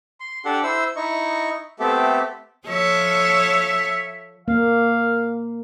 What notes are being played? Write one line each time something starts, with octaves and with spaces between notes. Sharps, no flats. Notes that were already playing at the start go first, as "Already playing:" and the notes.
C6
D4 G4 A4 F#5
E4 C5 E6
D#4 E4 D#5 C#6
A3 B3 C4 G4 A4 E5
F3 A4 C#5 E5
A#3 F5